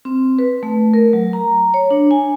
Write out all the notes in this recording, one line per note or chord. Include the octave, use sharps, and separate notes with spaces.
C4
B4
A3
A#4
F#3
A#5
C#5
D4
G#5